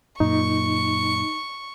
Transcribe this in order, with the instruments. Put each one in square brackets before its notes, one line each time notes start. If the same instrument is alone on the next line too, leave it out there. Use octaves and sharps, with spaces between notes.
[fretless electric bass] F#2 A#2 [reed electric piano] D#4 [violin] C#6